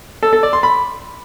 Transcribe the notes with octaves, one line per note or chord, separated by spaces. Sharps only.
A4
A4
D5
C6
B5